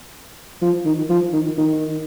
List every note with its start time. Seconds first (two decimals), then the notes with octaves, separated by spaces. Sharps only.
0.62 F3
0.85 D#3
1.09 F3
1.33 D#3
1.58 D#3